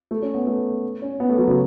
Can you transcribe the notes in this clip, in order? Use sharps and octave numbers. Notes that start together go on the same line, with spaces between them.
A3
C#4
B3
A3
C#4
B3
A3
F#3
C#3